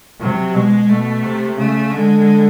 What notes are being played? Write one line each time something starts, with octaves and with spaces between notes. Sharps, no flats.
C3 F#3
B2 G#3
B2 A3
C3
C#3 A3
D3 G#3